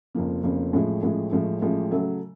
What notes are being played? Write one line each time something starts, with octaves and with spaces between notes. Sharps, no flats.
F1 F2 C#3 F3 A#3
F1 F2 C#3 F3 A#3
A1 A2 F3 G#3
A1 A2 F3 G#3
A1 A2 F3 G#3
A1 A2 F3 G#3
C#3 F#3 A3